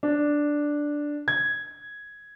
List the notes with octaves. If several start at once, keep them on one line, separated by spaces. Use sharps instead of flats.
D4
G#6